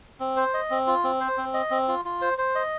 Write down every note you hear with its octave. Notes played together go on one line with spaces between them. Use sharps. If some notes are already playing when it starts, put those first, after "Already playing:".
C4
C5
D#5
C4
F4
C4
C5
C4
D#5
C4
F4
F4
C5
C5
D#5